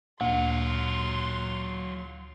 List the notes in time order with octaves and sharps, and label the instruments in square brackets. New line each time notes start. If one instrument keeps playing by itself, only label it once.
[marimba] D2 [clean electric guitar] A#2 [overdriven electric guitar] F#3 F4 [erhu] C6